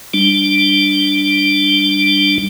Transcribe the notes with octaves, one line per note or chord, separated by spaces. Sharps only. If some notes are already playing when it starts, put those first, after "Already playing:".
G3 D4